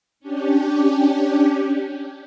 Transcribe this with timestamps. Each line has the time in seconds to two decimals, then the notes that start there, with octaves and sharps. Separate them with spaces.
0.20 C#4 D4 G4